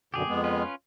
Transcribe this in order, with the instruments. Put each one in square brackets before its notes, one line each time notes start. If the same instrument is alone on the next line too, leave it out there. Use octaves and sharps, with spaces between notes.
[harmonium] F#2 B2 D3 [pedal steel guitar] G4 G#4
[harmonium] F2 G#3 B3
[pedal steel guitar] C#4 F4 B4